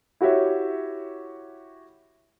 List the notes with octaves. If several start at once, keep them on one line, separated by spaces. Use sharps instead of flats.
E4 F#4 G4 C#5 E5